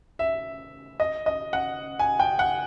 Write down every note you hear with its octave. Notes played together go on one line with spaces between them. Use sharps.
E5
D#5
D#5
F#5
G#5
G5
F#5